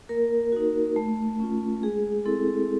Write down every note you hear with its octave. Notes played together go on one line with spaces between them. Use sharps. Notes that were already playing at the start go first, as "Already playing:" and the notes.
A#3 A#4
D#4 F#4
A3
C#4 F4
G#3 G#4
C4 E4 A4